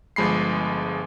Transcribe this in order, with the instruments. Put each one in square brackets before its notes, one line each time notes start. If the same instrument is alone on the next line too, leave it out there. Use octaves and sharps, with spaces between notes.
[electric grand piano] G1 F3 G#3 B5 C7